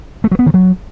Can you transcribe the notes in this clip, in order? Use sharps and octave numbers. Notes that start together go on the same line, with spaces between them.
A3
F#3
B3
D#3
F#3